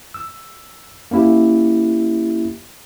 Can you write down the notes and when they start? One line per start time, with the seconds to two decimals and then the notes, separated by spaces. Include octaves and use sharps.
0.14 E6
1.11 A#3 C#4 E4 G4